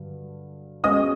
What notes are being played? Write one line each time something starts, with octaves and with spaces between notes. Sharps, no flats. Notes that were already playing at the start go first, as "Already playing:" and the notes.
Already playing: G2 D3 F#3
B2 G#3 C#4 D#5 D#6